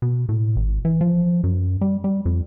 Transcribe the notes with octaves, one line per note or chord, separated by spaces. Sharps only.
B2
A2
G#1
E3
F3
F#2
G3
G3
F2